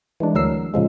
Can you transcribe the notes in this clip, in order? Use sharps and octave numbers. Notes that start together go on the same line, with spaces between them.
E3 G#3 D4
D2 F#3 A#4 E6 C7
A#2 C#3 F3 G#3